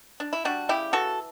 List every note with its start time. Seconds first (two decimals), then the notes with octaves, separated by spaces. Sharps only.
0.20 D4
0.33 E4
0.45 G3 D4 F#4
0.69 C#3 E4 G4
0.93 E3 F#4 A4